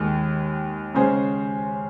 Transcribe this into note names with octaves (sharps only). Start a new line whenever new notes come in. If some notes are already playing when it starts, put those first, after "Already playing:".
Already playing: D#2 D#3 G#3
C#3 G#3 C#4 G#4 C5